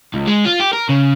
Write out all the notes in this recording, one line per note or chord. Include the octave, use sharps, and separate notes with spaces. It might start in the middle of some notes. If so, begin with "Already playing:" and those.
C#2
G#3
F4
G4
A#4
C#3